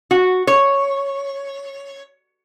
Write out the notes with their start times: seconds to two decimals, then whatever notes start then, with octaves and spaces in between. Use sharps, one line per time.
0.11 F#4
0.47 C#5